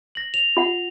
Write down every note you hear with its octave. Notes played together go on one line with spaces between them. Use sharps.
A#6 F#7
F7
F4 F#5